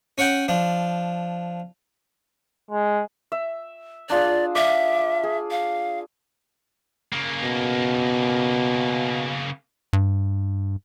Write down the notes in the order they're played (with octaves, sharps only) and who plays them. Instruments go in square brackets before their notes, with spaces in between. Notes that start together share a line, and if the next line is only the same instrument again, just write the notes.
[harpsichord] C#4 C#5 F#5 G5
F3 D4
[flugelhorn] G#3
[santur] E5
[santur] D4 F4 G#4 [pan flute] D5
[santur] D5 F5 [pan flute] E5
[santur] G#4
[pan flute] F5
[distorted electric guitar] C#3 A#3
[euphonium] B2
[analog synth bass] G2